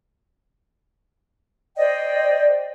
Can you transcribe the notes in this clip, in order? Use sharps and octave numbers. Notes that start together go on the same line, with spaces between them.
C5 D5 D#5 G5